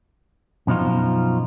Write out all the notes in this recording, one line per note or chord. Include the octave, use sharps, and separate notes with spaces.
F#2 B2 F3 D#4 F4